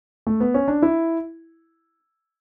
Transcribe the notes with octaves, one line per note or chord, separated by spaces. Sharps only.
A3
B3
C#4
D4
E4